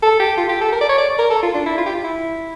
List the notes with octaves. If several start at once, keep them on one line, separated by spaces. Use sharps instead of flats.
A4
G4
F4
G4
A4
A#4
D5
C#5
D5
A#4
A4
F4
D4
E4
F4
G4
F4
E4